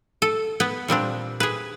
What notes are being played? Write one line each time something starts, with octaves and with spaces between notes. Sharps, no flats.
A4
B3 B4
A#2 G3 C4 D4
G#4 B4